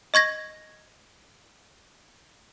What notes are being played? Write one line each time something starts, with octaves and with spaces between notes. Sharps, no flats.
D#5 C#6 G#6 A#6